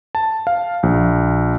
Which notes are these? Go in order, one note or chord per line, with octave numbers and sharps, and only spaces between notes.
A5
F5
A#1